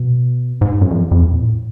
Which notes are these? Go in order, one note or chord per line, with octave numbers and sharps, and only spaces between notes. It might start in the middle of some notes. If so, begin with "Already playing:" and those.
Already playing: B2
G#2
G2
F#2
F2
E2
F2
E2
A#2
A2